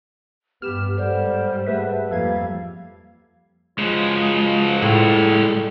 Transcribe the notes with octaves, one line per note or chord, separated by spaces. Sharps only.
G2 B3 G4 F6 E7
G#2 G3 A4 C5 D5 F#5
A3 G4 G#4 B4 E5 F#5
F2 G3 A#3 A4 F5 G#6
C#2 C#3 F3 F#3 G#3
A2 G3 G#3